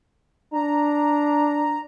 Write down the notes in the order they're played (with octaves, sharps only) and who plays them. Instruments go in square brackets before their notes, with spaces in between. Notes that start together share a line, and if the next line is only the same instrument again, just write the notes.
[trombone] D4 [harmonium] A#5